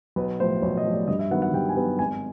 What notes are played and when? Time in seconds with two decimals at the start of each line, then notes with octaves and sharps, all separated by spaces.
0.16 B1 B4
0.40 A2 F3 C5
0.62 B1 C#5
0.77 D#5
0.85 A2 F3
0.93 D5
1.08 G2 D#5
1.19 E5
1.31 D#3 F#3 B3 F#5
1.42 F#5
1.53 G2 G5
1.69 G#5
1.77 D#3 F#3 B3
1.99 G#1 G#5